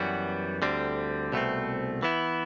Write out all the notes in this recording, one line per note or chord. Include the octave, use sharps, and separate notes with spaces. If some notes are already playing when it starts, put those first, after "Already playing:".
Already playing: F#2 E3 G3 B3 F#4
D2 D3 G3 C4
C2 B2 A3 C4
E3 B3 E4